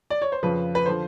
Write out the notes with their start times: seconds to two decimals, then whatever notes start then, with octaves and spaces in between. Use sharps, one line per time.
0.10 D5
0.22 C#5
0.32 C5
0.43 F2 C#3 F3 B4
0.75 B4
0.86 D3 F3 C5